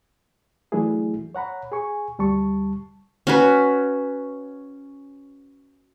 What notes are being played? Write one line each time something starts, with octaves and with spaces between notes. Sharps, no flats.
E3 F#3 A3 D4 E4 G#4
C#5 F#5 A#5 B5
G#4 G#5 C#6
D2 G3 A5 C#6
C#4 F#4 B4